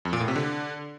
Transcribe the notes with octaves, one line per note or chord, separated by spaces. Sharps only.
F2
A#2
A2
C3
D3